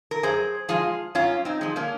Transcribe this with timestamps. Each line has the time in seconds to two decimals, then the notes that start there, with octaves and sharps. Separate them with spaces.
0.11 A#4
0.23 F#2 G#4 C5
0.68 F3 G#3 F4 G#4
1.15 F#2 C#4 F4
1.45 C4 D#4
1.61 F3 G#3
1.76 A#3 C#4